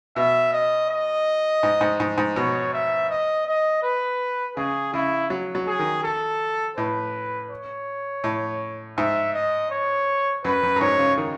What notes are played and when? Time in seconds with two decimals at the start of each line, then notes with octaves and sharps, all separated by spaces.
0.16 B2 E5
0.53 D#5
0.90 D#5
1.63 G#2
1.81 G#2
2.00 G#2
2.18 G#2
2.36 B2 C#5
2.74 E5
3.10 D#5
3.47 D#5
3.83 B4
4.57 C#3 G#4
4.93 C#3 E4
5.30 F#3
5.55 F#3
5.67 G#4
5.79 D#3
6.04 A4
6.77 A2 B4
7.51 C#5
8.24 A2
8.97 G#2 E5
9.34 D#5
9.70 C#5
10.44 F#2 B4
10.63 F#2
10.76 F#2
10.81 G#2 C#5
10.99 C#3
11.18 D#3